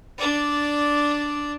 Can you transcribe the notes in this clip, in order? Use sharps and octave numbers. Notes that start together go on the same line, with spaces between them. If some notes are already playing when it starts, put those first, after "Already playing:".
D4 D5